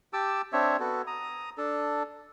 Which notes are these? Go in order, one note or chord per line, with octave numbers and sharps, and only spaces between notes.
G4 A5 D6 E6
C4 D4 C#5 E5
B3 F#4 A4
A#5 D#6
D4 A4